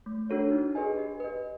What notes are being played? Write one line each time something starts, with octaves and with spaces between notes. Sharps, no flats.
A3
D4 F#4 A4 C#5
D#4
G#4 B4 D#5 G#5
G4
B4 D#5